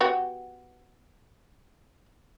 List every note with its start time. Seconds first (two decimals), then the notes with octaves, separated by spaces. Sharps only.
0.01 B3 F#4 G4